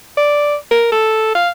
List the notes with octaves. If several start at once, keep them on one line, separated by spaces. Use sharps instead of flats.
D5
A#4
A4
F5